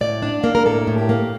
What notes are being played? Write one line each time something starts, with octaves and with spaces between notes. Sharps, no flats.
A2 D5
D4
A#3
A#4
A2 A4
A2
G4
A#3